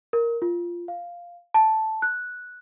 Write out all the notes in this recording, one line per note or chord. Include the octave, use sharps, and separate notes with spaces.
A#4
F4
F5
A5
F#6